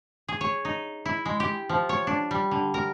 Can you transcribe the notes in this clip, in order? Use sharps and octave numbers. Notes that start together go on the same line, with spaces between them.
G#4
C#5
D#4
E4
G#3
G4
F3
C#5
D4
G3
D3
A#4